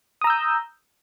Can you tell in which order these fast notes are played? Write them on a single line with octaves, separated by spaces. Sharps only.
D#6 A#5 E6 G6